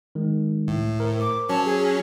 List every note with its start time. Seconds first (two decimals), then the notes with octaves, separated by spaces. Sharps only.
0.15 D#3 G#3
0.68 C#2 A2
1.00 A#4 C5
1.21 D6
1.49 F#3 C#4 A5
1.65 G#4